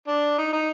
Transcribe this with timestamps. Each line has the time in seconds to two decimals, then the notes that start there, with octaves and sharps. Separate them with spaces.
0.08 D4
0.38 D#4
0.53 D#4